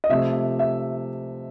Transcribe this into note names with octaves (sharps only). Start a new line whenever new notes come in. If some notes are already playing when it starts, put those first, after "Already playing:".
D#5
C3 F3 A3 E5
E5